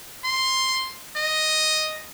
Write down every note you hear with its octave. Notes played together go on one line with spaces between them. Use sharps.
C6
D#5